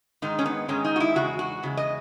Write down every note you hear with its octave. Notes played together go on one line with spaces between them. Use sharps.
G#2 D#3 G#3 D#4
C#4
B3
G#2 D#3 G#3 C#4
D#4
F#4
E4
E2 C#3 G#3 F#4
F#4
E2 C#3 G#3
D#5